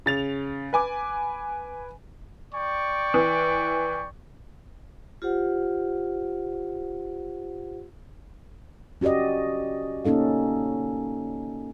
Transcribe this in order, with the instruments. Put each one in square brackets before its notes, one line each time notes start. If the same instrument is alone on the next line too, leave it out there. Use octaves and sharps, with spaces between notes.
[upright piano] C#3 A6 F7
B4 G#5 D6
[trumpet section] D5 G5 C#6
[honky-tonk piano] E3
[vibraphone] F4 G4 C5 F#5
[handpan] C#4 F#4 G4 D5 D#5
A#3 C#4 D#4 A4 F5